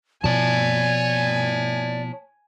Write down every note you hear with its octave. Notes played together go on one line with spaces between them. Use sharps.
B2 F3 C#5 D5 G#5 A5